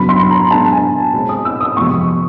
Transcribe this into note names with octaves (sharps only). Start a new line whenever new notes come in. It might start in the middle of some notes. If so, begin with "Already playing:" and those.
Already playing: F#2 C#3 F#3 B3 D4 B5
C6
A#5
B2 G#3 B3 D4 A5
G#5
B2 G#3 C4
D#6
E6
D#6
F2 C3 F3 G#3 B3 C#6